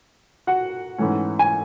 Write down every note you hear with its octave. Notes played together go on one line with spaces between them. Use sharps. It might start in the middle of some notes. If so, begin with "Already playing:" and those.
F#4 F#5
G#2 E3 A3 C#4
G#5